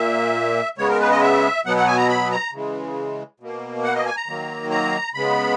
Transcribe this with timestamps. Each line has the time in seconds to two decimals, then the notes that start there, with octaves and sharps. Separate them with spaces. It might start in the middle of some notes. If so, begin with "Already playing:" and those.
Already playing: A#2 A#3 E5
0.78 C#3 G#3 B3 C#5
0.89 A#4
1.00 B4
1.11 D#5
1.21 E5
1.65 B2 F#3 B3 F#5
1.77 F#5
1.87 G#5
1.98 A#5
2.08 B5
2.32 A#5
2.53 C#3 E3 G#3
3.40 B2 A#3
3.84 F#5
3.95 D#5
4.05 G#5
4.17 A#5
4.27 D#3 F#3 A#3
4.71 A#5
5.14 C#3 G#3 B3 B5